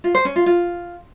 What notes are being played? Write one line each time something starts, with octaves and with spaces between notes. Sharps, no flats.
F4
C5
C#4
F4
F4